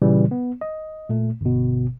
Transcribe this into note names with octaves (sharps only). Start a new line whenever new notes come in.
A#2 C#3 E3 G3
B3
D#5
A#2 A3
G1 B2